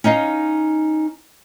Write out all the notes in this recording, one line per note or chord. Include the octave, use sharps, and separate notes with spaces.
C#4 D#4 D#5 F5